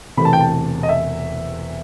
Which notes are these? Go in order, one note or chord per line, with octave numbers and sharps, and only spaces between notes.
E1 E2 C3 E3 A3 B5
A5
G5
A5
D#5
E5